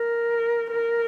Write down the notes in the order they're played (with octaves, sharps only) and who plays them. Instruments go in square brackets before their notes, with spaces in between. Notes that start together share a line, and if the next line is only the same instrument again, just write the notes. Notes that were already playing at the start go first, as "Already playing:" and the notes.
Already playing: [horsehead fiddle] A#4
A#4